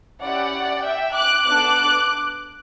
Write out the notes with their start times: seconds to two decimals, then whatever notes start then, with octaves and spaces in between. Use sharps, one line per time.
0.21 C#4 E4 G4 D5 F#5
0.84 E5 G5
1.14 D6 F#6
1.46 B3 D4 A4 D6 F#6